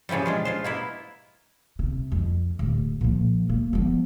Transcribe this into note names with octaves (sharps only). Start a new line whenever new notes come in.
A#2 C#3 E3 F3 G3
G#3 D4 F4
B2 F4 C5
A#3 B3 E4
C3
F2
D1
A#2 F3
A#3
F3 B3